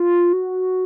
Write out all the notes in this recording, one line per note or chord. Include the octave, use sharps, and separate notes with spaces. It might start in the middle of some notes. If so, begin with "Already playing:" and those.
Already playing: F4
F#4